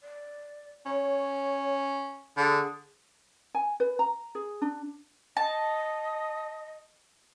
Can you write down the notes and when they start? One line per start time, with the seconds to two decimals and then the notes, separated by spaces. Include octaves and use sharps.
0.01 D5
0.86 C#4 C#5
2.37 D3 G#4
3.55 G#5
3.80 B4
3.99 A#5
4.35 G#4
4.62 D4
5.37 D#5 A5